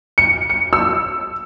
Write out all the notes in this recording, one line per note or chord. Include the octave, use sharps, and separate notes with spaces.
C#7
C#7
E6